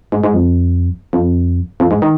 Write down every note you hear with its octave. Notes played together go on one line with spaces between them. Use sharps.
G#2
G#2
F2
F2
F2
G#2
D#3